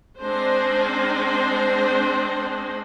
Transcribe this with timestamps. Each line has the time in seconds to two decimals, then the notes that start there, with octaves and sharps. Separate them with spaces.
0.19 G#3 C4 D4 C5